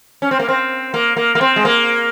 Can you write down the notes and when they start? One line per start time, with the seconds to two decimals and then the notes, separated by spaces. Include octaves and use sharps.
0.22 C#4
0.31 C4
0.40 A#3
0.49 C4
0.94 A#3
1.17 A#3
1.35 A#3
1.41 C4
1.56 G#3
1.65 A#3